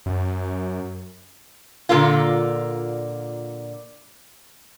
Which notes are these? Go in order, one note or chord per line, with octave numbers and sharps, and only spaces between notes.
F#2
A#2 D3 A#3 F4